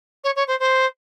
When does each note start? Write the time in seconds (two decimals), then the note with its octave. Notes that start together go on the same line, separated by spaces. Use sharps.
0.23 C#5
0.35 C#5
0.47 C5
0.59 C5